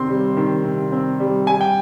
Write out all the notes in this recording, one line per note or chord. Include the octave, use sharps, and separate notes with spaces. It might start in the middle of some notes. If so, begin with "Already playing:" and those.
Already playing: C3 D#3 C4 C6
G3
D#3
C3
C4
G3
G3 G#5
G5